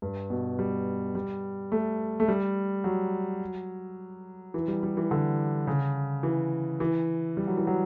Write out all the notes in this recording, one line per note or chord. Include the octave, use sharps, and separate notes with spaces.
G2
B2
G3
G3
A3
A3
G3
F#3
E3
G3
G3
E3
D3
C#3
E3
E3
G3
F#3
E3
F#3